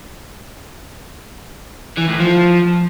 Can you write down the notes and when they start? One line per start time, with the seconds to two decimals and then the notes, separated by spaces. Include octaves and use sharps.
1.98 E3
2.09 A2
2.20 F3